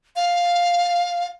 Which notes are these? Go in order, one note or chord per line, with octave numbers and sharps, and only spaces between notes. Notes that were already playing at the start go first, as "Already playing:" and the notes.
F5